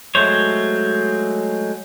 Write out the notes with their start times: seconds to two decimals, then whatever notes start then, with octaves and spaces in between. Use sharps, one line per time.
0.15 F#3 G#3 A3 C5 C#5